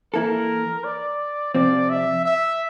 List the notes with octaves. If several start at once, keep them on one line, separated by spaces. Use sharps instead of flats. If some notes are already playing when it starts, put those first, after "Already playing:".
E3 A#3 E4 A4 A#4
D5
C3 F3 C4 D5
E5
E5